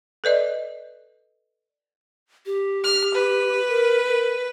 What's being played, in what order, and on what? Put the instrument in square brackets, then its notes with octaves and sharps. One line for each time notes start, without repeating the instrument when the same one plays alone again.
[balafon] A4 B4 D5 D#5
[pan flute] G4
[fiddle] F6
B4
[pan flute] A#4
A#4